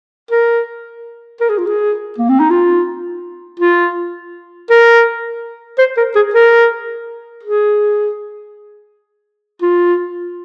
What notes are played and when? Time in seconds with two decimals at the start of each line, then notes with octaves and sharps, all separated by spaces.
0.31 A#4
1.40 A#4
1.49 G#4
1.58 F4
1.67 G#4
2.18 A#3
2.29 C4
2.40 D#4
2.50 F4
3.60 F4
4.70 A#4
5.78 C5
5.97 A#4
6.15 G#4
6.34 A#4
7.43 G#4
9.62 F4